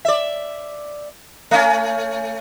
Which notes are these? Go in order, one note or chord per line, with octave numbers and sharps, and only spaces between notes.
D5 E5
A3 C#4